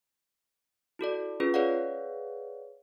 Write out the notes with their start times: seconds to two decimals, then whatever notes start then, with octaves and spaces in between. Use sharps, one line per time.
0.99 E4 F#4 A4 D5
1.40 C#4 F4 G#4 B4
1.54 G#4 B4 C#5 D5 F5 F#5